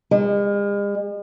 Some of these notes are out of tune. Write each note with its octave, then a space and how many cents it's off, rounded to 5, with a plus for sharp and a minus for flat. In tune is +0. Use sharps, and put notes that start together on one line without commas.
G#3 -45